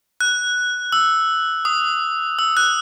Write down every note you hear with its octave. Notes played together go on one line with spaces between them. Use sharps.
F#6
E6
D#6
E6
F#6